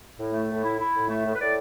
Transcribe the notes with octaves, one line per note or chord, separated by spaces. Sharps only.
A2
A3
A2
E4
E4
A2
A3
A2
B4
A2 D5